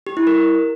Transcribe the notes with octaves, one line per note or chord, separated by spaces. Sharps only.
G4
E4
A#4